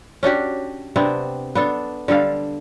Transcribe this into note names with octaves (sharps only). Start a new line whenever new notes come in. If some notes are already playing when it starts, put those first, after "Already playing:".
C#4 D4 F#4 G4
C3 B3 C4 D4
B3 D4 A4
D3 G3 A4 F5